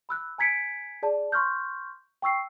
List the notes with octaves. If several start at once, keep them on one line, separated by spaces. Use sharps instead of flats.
B5 E6 F#6
G#5 A#5 G#6 B6 C#7 D7
G#4 D5 A5
C6 C#6 F6 G6
G5 C#6 E6 C7